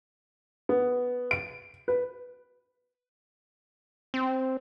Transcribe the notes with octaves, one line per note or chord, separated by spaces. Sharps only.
B3
D7
B4
C4